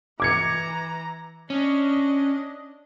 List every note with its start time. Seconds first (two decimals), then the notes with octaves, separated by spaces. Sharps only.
0.20 E3 A#5 D6 G#6 C#7
1.50 C#4 D4 D#5